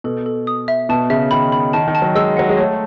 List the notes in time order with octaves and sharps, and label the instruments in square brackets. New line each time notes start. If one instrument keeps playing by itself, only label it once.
[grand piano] B2 [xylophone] A4
[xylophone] A4
D#6
E5
[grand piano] B2 [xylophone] A5
[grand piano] C#3 [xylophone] E5
[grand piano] D#3 [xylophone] B5
[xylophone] B5
[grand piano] D#3 [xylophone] A5
[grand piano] D#3
[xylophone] A5
[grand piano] F#3
[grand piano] G#3 [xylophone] E6
[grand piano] F#3 [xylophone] F#5
[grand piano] G#3
[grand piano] A3 [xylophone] C#5